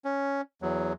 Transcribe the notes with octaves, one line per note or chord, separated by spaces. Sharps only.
C#4
E2 F#3